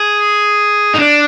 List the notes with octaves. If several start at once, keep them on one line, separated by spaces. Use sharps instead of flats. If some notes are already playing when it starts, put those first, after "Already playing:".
Already playing: G#4
D#4
D4